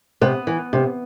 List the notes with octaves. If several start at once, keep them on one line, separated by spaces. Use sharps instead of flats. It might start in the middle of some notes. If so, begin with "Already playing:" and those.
C3 B3
E3
C3